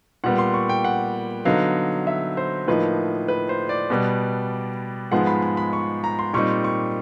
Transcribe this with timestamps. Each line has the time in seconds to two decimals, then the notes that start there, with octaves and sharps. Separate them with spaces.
0.24 A#2 G3 B3 F#5
0.38 C6
0.54 C#6
0.69 G5
0.85 F#5
1.45 D3 F#3 B3 D#4 F5
2.07 E5
2.37 C5
2.67 A2 F3 A#3 D#4 B4
3.28 B4
3.49 C5
3.69 D5
3.90 B2 G3 B3
5.12 G#2 F3 G#3 B3 F#5
5.27 B5
5.42 B5
5.57 B5
5.73 C#6
6.04 A#5
6.19 C6
6.34 A#2 G3 C4 D#4 C#6
6.64 C#6